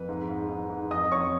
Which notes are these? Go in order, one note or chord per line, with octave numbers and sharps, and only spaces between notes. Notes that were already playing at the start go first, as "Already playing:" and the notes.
Already playing: F2 B4
G#2
G#2
G#2
G#2
F2 D#5 D#6
F2 C#5 C#6